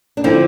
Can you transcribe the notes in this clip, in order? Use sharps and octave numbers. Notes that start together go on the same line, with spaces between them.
D4
D3 F3 C4 E4